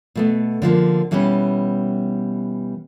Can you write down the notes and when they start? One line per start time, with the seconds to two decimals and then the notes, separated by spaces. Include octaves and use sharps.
0.15 B2 A3 B3
0.62 D3 F3 G#3 A#3
1.11 B2 E3 G3 B3 C#4